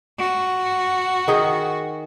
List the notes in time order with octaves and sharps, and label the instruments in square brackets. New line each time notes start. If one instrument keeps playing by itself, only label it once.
[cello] F#4
[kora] D#3 G#4